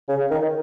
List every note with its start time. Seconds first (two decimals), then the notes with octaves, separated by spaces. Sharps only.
0.08 C#3
0.30 D#3